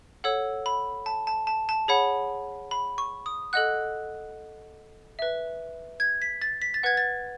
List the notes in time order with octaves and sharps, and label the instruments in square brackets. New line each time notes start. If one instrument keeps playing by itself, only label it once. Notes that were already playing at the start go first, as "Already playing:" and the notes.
[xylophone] A4 C#5 F#5 E6
B5
A5
A5
A5
A5
G#4 C#5 F#5 B5
B5
C#6
D#6
A4 D#5 F#5 F#6
B4 E5
G#6
B6
A6
B6
A6
B4 F#5 G#6
A6